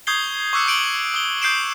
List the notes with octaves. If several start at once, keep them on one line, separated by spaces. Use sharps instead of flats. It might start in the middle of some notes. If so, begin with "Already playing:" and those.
C#6 D#6 G6 G#6 C7 G7
C#6 D6 E6 F#6 C7 C#7
D#6 G6 D7 F#7 G7
D#6 G7
D#6 G6 C7 D7 E7